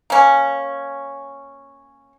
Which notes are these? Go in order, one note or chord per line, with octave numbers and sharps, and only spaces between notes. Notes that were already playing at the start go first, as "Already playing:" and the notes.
A#3 C#4